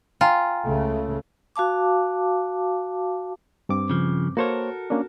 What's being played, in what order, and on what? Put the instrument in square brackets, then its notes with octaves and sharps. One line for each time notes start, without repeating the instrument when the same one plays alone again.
[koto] F4 [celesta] G5 G#5 A#5
[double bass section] C#2 C#3 A3
[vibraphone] F#4 F5 A5 D6
[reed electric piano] G2 C4 D6
[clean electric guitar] C#3 F3
[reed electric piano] A#3 C5 C#5 [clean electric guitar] F#4 A4 A#4
[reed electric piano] A#3 C#4 D4